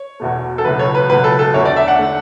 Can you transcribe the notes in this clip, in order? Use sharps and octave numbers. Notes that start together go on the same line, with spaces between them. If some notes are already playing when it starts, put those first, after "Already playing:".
Already playing: C#5
E2 B2 A3
A4
C#2 B2 F#3 A3 B4
C#5
B4
C#2 B2 F#3 A3 B4
A4
A4
E2 D3 A3 C#5
D5
E5
F#5
D3 A3